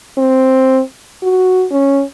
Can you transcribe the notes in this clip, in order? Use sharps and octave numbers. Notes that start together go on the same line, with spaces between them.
C4
F#4
C#4